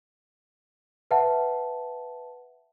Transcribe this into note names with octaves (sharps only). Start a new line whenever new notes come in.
B4 E5 F#5 A5